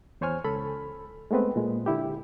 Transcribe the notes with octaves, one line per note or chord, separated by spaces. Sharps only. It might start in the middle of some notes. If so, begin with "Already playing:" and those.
E2 C5 C#5 G#5 F6
C#2 A4 B5
G#3 A3 B3 C4 B4
A#2 G#3
D3 E4 G4